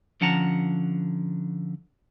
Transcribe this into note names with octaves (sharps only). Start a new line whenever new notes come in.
D3 F3 C#4 F#5 A5 A#5